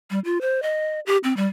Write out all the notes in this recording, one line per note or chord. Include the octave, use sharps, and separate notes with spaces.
G3
F4
C5
D#5
G4
C4
G3